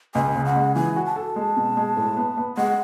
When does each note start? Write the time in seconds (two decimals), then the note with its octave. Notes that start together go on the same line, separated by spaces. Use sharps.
0.15 C#2 G#5
0.35 C#3
0.46 F#5
0.56 G#3
0.75 E3 G#5
0.96 F#4
1.06 A5
1.16 A4
1.36 G#3
1.56 B2
1.77 G#3
1.97 A2
2.17 B3
2.37 B3
2.57 G#3 F#5